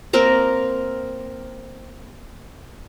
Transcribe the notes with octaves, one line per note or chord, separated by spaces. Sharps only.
A#3 C4 A#4